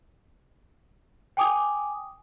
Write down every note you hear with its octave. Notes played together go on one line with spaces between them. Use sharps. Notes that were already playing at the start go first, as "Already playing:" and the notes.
G5 G#5 D6 D#6